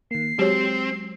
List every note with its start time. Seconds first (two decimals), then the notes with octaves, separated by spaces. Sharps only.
0.11 D#3 A#3 C7
0.39 F#3 G#3 C4 G4 C#5